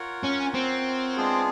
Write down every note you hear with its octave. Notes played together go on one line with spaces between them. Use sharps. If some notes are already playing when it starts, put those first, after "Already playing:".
Already playing: F4 A#4 C#5 F#5
C#4
C4
G#3 B3 D4 F4 G#4